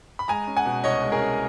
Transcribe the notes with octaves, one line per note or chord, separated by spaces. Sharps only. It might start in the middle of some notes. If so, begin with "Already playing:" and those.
B5
G#3 G#5 A#5
C#4
F#5 G#5
B2
C2 C#5 D#5
G#3
G#4 A#4
C#4